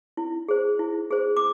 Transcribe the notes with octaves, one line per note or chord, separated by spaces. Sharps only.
E4
G#4 C5
E4
G#4 C5
D6